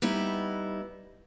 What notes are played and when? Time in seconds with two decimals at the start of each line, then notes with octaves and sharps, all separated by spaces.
0.02 G3 B3 D#4 E4